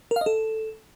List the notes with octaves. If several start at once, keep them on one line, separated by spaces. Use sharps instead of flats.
A#4
F5
D#5
A4